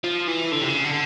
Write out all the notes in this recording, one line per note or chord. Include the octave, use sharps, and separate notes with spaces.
F3
E3
D3
C3
C#3
D3